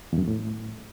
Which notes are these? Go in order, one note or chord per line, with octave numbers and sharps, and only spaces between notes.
E2
F#2
E2
A2